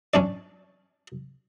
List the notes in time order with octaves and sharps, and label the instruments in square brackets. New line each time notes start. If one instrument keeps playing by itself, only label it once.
[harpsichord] C#4 D4 D5